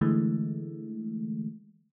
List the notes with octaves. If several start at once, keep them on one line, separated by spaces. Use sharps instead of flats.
D3 E3 G#3 A3